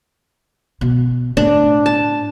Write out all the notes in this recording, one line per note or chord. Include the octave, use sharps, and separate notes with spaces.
B2
A2 D4
A5